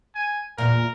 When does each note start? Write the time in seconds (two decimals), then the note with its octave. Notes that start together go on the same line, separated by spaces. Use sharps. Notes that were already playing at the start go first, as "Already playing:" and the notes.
0.15 G#5
0.58 E2 A#2 A#4